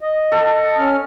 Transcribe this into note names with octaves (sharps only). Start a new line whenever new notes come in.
D#5
A4 F#5
C#4 F6